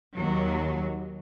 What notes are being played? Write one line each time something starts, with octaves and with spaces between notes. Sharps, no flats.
D#2 F#3